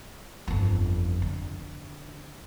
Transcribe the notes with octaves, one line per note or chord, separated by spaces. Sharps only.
G1 F2
D3